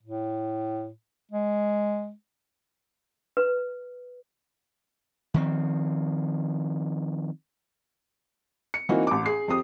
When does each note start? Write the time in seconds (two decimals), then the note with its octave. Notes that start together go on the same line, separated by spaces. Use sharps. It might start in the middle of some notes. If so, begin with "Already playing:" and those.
0.03 A2
1.31 G#3
3.37 B4
5.34 D#3 F3 C4
8.74 C#7
8.89 E3 A#3 C4 D#4 F#4
9.07 A1 D6
9.26 G#4 C7
9.48 F2 C4 G4 D#6